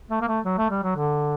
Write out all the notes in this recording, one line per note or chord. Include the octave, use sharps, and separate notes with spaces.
A3
A#3
A3
F#3
A3
G3
F#3
D3